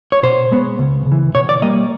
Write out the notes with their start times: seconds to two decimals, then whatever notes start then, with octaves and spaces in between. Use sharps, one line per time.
0.12 C#5
0.23 B2 C5
0.52 G#3 B3
0.79 C#2
1.06 C#3
1.12 E3
1.35 B2 C#5
1.49 D5
1.62 G3 A#3 D#5